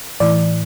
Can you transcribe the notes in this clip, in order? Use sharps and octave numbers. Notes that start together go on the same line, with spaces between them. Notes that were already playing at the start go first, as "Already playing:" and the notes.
A2 E3 D5